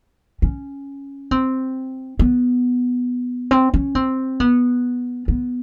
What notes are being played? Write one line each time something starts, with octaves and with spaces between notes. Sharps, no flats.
C#4
C4
B3
C4
C#4
C4
B3
B3